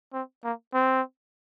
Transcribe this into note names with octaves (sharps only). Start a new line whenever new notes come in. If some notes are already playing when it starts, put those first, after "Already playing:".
C4
A#3
C4